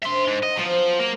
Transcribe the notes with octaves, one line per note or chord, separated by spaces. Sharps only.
D#3 C4 D4 E5 C6
G#2
F#4 D#5
F3 F#3 B3 C4
A#3